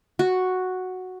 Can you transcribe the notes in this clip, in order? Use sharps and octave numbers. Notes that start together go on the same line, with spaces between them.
F#4